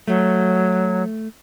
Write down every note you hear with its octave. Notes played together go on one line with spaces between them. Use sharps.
F#3 A3